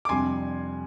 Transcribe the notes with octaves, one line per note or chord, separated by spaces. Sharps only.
D6
F2 C3 G3 D4 G#5 C6